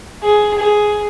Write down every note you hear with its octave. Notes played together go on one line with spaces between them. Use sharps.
G#4
G#4